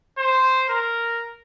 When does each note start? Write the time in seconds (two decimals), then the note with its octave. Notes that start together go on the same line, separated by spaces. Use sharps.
0.18 C5
0.69 A#4